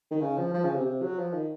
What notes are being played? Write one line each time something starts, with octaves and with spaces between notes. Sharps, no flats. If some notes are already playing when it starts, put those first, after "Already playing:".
D#3
C#3
F3
F3
C#3
C3
C3
F#3
F3
D#3